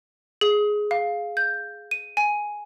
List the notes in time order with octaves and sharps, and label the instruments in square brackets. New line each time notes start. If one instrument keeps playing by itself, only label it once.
[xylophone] G#4
F5
G6
D#7
G#5